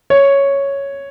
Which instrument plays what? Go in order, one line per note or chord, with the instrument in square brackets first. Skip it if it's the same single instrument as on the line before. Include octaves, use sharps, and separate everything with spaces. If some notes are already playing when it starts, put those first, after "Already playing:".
[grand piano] C#5